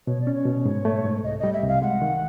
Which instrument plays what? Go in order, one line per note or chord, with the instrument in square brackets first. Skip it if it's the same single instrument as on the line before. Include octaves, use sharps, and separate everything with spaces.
[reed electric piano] B2 [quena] C#5
[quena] D5
[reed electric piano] C#4
[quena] C#5
[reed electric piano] B2
G#2
A3
G#2
[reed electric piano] C2 [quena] D#5
[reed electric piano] G3 [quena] D#5
[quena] E5
[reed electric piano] C2
[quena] F5
[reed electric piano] G#3 [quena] F#5
[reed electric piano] D#3